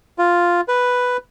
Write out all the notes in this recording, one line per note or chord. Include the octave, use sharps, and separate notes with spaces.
F4
B4